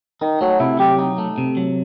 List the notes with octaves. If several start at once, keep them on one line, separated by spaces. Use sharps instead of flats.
D#3 D#4
F#3 A3
C3 E4
F#3 G4
D#4
A3
C3
F#3